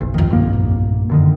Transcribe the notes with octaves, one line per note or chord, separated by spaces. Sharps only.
F#1 B1
C2 F2 D#3 B3
B1 G2 A#3
A#2
F#2 D3 D#3